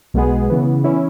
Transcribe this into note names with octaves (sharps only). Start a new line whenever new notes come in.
B1 B2 G#3 B3 G#4
C#3 E3 B3
E3 C#4 E4